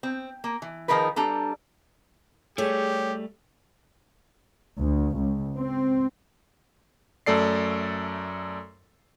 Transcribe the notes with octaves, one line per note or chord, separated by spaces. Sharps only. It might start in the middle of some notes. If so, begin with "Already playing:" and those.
C4
A#3
E3
D#3 F3 D#4 G#4 A#4 B4
G3 D4 A4 A#5
G3 A3 G4 G#4 C#5
D2
C#2
C4
F#2 A3 A4 D5 C7